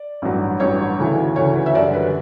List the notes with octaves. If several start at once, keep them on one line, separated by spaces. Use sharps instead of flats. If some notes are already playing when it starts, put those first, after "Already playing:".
Already playing: D5
A1 G2 F#3
A1 G2 F#3 C#5
D2 C#3 E3
D2 C#3 E3 C#5
B4
E5
F#2 D3 G3 D5
B4